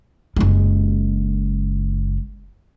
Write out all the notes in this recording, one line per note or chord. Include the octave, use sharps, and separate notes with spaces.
F#1 G#3